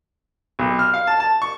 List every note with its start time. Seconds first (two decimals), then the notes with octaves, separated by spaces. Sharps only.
0.59 B1
0.79 F6
0.94 F5
1.07 A5
1.20 A5
1.42 C#6